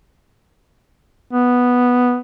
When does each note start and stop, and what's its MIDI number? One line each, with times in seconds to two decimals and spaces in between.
1.33 2.18 59